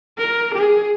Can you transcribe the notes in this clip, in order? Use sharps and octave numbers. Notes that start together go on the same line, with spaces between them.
A#4
G#4